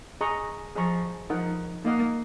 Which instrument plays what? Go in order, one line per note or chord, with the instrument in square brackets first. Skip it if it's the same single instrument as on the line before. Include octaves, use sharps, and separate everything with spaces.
[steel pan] G#4 D#5 A#5 C#6
[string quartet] F3 [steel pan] G#4 D#5 A#5 C#6
[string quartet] F3 [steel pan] D#4 A#4 D#5 F#5
[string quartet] A#3 [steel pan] D#4 A#4 D#5 F#5